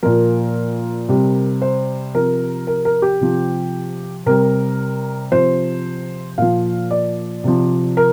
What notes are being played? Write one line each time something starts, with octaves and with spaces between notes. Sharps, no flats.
A#2 F3 A#4
C3 G3
C5
C3 F3 A#4
A#4
A#4
G4
C3 F3
C3 G3 A#4
C3 F3 C5
A#2 F3 F5
D5
C3 F3
A#4